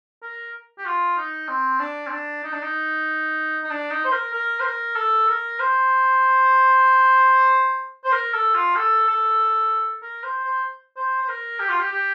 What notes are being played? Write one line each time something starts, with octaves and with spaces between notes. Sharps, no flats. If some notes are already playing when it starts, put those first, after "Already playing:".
A#4
G4
F4
D#4
C4
D4
C4
D4
D#4
D4
D#4
D#4
D4
D#4
C5
A#4
A#4
C5
A#4
A4
A#4
C5
C5
A#4
A4
F4
A4
A4
A#4
C5
C5
C5
C5
A#4
G4
F4
G4
G4